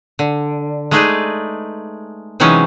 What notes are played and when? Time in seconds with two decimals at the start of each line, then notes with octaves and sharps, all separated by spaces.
0.19 D3
0.91 G#3 A3 D#4 G#4 B4 D5
2.40 C3 E3 F#3 G#3 C#4 D#4